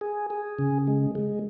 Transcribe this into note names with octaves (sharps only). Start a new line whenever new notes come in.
G#4
G#4
C#3
G#3
G#3